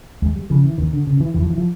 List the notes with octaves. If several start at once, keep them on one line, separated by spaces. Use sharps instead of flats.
D#2 G#3
G3
C#3 F3
E3
D#2 D#3
D3
C#3
E3
E2 E3
F3
E3
F3